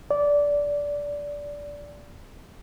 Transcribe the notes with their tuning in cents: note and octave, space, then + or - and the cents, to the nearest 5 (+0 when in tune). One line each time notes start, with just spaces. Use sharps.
D5 -15